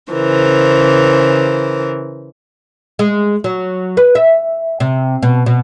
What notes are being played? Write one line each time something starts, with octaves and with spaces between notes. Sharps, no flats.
C#3 E3 A#4 C5
G#3
F#3
B4
E5
C3
B2
B2